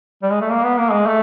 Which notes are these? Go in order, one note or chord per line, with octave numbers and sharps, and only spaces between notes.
G3
G#3
A3
A#3
B3
A#3
G#3
A3